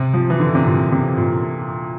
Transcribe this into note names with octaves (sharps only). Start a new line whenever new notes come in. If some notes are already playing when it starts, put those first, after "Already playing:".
Already playing: C3
F3
E3
D3
C3
A#2
C3
A#2